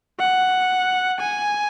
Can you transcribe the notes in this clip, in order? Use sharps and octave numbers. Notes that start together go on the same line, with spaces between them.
F#5
G#5